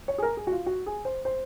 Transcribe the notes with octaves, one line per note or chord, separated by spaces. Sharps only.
C#5
G#4
A#4
G#4
F#4
F4
F#4
G#4
C5
C5